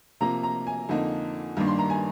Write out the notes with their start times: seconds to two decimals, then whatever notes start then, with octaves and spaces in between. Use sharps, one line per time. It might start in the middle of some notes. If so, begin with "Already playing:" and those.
0.21 C3 F3 A#3 A#5
0.43 A#5
0.67 G#5
0.89 F2 D3 F3 A#3 D#4
1.57 G2 D#3 G3 A#3 D4
1.68 C6
1.79 A#5
1.90 G#5